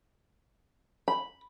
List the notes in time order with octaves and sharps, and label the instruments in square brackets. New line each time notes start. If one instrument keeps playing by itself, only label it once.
[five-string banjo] B5